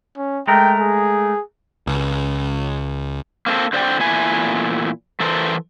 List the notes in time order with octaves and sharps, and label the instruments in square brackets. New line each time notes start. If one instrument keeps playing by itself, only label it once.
[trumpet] C#4
[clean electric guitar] G#3 A3 A#4 [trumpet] G5
[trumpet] G#4
[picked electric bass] C#2
[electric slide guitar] A#3 C4 A4
D3 C5 D5 F5 G5
E2 A#2 A3 E4 G#5
E3 A4 A#4 C5